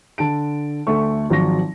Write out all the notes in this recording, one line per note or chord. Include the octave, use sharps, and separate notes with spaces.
D3 A5 D7
D2 A3 C#6
G#1 F3 F#3 C#6 A#6